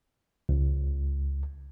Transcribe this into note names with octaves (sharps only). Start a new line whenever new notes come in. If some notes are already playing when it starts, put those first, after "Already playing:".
C#2